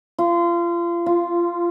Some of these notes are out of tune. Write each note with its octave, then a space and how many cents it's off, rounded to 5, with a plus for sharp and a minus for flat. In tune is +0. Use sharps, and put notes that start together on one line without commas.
F4 -30
F4 -10